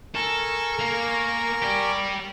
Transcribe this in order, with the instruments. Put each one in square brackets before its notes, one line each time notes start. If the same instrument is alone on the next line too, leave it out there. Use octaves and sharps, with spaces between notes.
[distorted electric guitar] A4 [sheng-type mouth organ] A#4 G#5 C#6
[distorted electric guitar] A#3
G4 D5